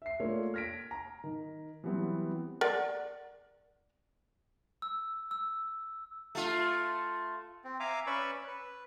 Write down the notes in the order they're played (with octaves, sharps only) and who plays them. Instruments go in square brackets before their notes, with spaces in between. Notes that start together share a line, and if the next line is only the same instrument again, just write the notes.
[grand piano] E5 C7
A3 A#3 F4 A#4 C#5 D5
F6 G#6 A#6 B6 D7
A#5
D#3
E3 F#3 G3 B3 C4
[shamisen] A#4 D5 F#5
[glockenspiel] E6
E6
[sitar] A3 F4
[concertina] C4
E5 F5 G#5 A#5 D6
C#4 B4 D5 B5 C#6 E6
B4